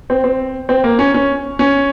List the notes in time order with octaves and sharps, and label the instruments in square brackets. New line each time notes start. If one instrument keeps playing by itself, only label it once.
[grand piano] C4
C4
C4
A#3
C#4
C#4
C#4